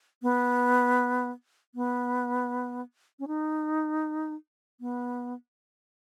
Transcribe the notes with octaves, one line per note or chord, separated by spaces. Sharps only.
B3
B3
C#4
D#4
B3